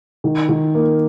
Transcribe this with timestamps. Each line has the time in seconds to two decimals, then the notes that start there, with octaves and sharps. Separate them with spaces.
0.24 D#3
0.49 D#3
0.75 A#3